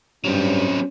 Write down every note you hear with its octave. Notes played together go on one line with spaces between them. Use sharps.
G2 F#3 C4 C#4